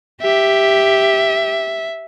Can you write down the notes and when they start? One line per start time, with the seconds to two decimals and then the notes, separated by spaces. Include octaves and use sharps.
0.22 G4 E5